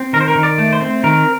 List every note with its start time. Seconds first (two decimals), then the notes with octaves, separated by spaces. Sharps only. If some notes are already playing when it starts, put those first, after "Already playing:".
Already playing: C4
0.13 D#3 A#4
0.21 C5
0.28 A#4
0.35 D#3
0.43 D5
0.58 A3
0.73 C5
0.81 C4
1.04 D#3 A#4